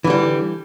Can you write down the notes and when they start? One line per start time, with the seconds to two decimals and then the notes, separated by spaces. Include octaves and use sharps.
0.04 E3
0.07 D3
0.10 G3